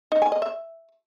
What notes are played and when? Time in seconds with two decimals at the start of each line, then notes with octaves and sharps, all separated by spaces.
0.12 D#4
0.22 G#5
0.32 D#5
0.42 E5